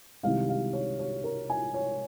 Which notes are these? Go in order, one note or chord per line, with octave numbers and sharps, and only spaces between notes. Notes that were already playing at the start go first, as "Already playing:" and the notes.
C2 C3 D#3 G#3 F5
F5
C#5
C#5
A#4
G#5
C#5